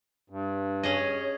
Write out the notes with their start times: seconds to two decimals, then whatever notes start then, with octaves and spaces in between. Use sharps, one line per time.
0.30 G2
0.83 C#4 G#4 C#5 D#5